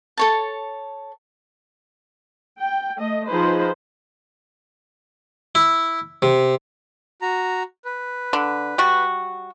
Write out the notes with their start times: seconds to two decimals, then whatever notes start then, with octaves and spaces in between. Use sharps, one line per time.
0.18 A4 C#5 A5
2.59 G5
2.96 A3 D#5
3.26 F3 D#4 G#4 B4 C5
5.55 E4
6.22 C3
7.22 F#4 A#5
7.85 B4
8.33 D3
8.78 G3 F#4